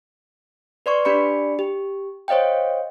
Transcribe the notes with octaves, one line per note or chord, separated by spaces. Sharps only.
B4 D5 C6 C#6
D4 G4 D5 B5 C#7
G4
C5 C#5 D#5 F5 G5